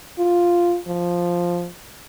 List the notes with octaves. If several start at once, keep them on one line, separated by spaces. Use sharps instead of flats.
F4
F3